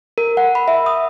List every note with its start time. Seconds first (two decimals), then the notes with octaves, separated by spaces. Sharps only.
0.18 A#4
0.37 F#5
0.55 B5
0.68 E5
0.86 D#6